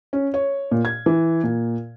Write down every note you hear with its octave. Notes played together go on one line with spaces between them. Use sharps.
C#4
C#5
A#2
G#6
E3
A#2